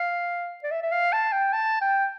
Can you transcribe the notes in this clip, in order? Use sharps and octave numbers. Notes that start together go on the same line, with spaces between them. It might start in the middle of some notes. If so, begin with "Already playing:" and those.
Already playing: F5
D5
E5
E5
F5
A5
G5
A5
G5